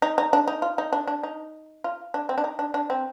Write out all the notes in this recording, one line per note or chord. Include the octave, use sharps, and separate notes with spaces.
D#4
D#4
D4
D#4
F4
D#4
D4
D4
D#4
F4
D4
C4
D4
D#4
D4
D4
C4